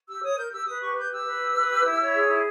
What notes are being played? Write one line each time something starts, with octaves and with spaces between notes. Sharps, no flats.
G4 E6
C#5 D#6
A#4 G6
G4 E6
B4 D#6
G4 C#6
B4 G6
G4 E6
B4
G4
B4
G4
E4
C#5
G#4
E4